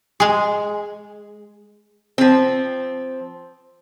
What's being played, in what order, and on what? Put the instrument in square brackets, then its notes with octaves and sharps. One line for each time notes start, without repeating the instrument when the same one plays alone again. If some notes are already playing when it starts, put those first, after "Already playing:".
[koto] G#3 G#4
[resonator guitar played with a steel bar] F3 C4